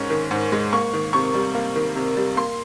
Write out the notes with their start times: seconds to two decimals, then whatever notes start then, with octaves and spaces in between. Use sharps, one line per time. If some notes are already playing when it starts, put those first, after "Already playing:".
Already playing: G#2 D#3 G#3 C#4 C#6
0.10 D#3
0.31 G#2
0.52 G#3
0.72 A#3 C#6
0.93 D#3
1.13 C3 C#6
1.34 G3
1.54 A#3
1.76 D#3
1.95 C3
2.17 G3
2.36 A#3 C6